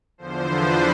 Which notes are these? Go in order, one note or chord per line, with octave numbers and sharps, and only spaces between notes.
E2 D3 F3 C5
B4